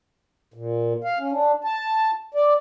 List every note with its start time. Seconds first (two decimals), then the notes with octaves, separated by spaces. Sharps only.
0.54 A#2
1.04 F5
1.19 C#4
1.32 D4
1.64 A5
2.35 D5